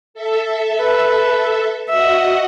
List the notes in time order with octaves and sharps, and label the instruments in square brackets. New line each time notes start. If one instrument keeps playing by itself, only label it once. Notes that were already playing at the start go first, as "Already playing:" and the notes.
[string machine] A4 E5
[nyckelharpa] B4
[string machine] F#4 D#5 F#5 [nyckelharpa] E5